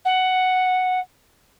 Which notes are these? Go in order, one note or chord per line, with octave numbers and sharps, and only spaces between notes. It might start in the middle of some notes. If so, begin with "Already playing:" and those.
F#5